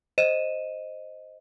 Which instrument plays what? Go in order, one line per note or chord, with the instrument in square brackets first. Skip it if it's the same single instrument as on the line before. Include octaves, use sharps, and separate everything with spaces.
[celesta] C5 D#5 D#7 E7